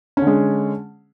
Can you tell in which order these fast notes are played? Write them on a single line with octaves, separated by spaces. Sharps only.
C#4 D3 G#3